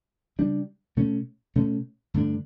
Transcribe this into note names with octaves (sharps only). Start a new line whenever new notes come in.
C#3 G3 D4
B2 A3 C#4
B2 A3 C#4
G2 D3 A3 D4